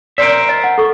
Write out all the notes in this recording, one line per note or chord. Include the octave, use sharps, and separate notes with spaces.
A#4 C5 D5 E5
D#5
F#5
A4 C#6